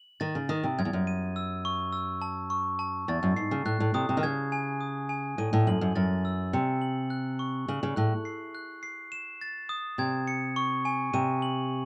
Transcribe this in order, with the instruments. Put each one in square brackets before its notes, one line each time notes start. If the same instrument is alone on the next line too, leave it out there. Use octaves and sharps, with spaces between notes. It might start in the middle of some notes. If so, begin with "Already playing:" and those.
Already playing: [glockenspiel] F#7
[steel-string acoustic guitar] D#3 [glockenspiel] A6
[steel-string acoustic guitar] C#3
[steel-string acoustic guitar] D#3 [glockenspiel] D#6
[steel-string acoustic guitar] C3
[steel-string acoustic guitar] F#2 [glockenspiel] G#6
[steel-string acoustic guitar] E2
F#2
[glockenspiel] D#7
E6
C#6
E6
A5
C#6
A5
[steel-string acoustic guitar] E2 [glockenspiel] A6
[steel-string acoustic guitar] F#2
[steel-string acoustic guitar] G#2 [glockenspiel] C7
[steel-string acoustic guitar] C#3
[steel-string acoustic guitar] A2 [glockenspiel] F#6
[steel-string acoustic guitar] A2
[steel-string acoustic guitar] C3 [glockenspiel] D#6
[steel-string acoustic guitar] C3
D#3
[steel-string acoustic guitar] C#3 [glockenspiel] G#6
[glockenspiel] G#5
D#6
G#5
[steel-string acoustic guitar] A2 [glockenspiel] D#7
[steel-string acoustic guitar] A2
[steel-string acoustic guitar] F#2 [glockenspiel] F#7
[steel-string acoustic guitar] F#2
[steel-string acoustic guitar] F#2 [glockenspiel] A6
[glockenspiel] E6
[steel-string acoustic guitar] C3 [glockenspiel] C#7
[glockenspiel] F#7
F#6
C#6
[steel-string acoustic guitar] C#3 [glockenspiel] F#7
[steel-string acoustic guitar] C#3
[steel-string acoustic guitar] A2 [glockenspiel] F#6
[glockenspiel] C7
F#6
C7
E7
A6
D#6
[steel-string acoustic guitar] C3 [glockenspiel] G#6
[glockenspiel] C#7
C#6
G#5
[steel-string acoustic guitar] C3 [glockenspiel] D#7
[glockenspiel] F#7